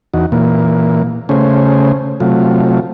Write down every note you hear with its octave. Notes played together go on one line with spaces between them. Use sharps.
E2 D#4 F#4
A#2 E3 A#3
C#3 A3 C#4 G#4 C5
C3 F#3 A3 F4